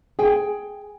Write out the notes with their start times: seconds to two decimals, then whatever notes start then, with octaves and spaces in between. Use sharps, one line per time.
0.19 G#4 G5 G#5